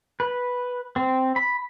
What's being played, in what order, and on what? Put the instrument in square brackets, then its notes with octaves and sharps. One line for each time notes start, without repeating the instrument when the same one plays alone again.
[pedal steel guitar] B4
C4
B5